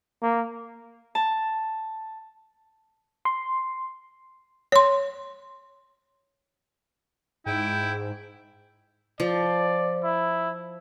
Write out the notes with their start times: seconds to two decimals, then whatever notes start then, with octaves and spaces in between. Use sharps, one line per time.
0.22 A#3
1.15 A5
3.25 C6
4.72 C#5 C6
7.46 G#2 E4 G5
9.20 F3 D5
10.04 E4